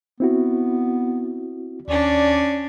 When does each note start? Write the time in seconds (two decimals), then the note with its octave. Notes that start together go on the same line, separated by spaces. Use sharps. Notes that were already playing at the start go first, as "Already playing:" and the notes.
0.20 B3 C4 E4 F#4
1.88 D#2 C#4 D4 D5